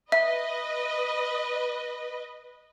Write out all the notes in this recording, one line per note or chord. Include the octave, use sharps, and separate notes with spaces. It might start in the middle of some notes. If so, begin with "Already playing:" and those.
B4 D#5 E5